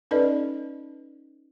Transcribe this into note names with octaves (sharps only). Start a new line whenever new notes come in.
C#4 D#4 A4 B4 D5 D#5